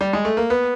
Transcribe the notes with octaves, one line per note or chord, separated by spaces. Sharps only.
G3
G#3
A3
A#3
B3